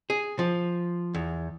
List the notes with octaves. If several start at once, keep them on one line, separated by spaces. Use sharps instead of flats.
G#4
F3
E2